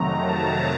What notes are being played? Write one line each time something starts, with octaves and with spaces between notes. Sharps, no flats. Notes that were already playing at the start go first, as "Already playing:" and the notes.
Already playing: F2 C3 D#3 F#3 A3 A#5
A5